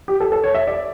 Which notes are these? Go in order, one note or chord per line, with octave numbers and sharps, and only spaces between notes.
G4
A4
A4
C#5
E5
D5